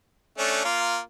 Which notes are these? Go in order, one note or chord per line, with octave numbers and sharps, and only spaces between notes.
A3 C#4 D4
A#3 F4